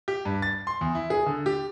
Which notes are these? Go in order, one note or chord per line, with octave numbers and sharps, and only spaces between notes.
G4
G2
A6
C6
E2
E4
G#4
D3
G4